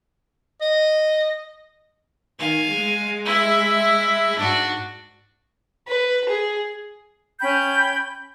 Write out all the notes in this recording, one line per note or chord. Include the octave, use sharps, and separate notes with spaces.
D#5
D#3 F5 G#5
G#3
E4 E5
G#2 D4 F#4
B4
G#4
C#4 G5 B5 G6